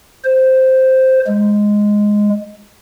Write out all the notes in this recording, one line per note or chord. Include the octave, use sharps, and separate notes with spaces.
C5
G#3